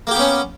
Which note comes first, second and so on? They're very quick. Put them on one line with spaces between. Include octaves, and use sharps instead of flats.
A#3 G4 B3 C#4